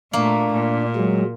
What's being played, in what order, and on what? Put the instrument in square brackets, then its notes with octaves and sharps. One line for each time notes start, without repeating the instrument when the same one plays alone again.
[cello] A#2 A3 [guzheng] A#3 [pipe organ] D4
[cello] A#2
[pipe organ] F#3 G#3